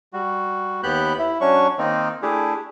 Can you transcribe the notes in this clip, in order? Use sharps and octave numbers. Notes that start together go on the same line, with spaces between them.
G3 F#4
D#2 B3 G4 B5 F#6 G6
E4
F#3 C#4 D4 C#6
D#3 A#3 C4 D#4
A3 D4 E4 G4 G#4